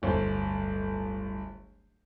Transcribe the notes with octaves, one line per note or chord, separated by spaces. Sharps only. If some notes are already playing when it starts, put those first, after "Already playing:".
D1 G1 C5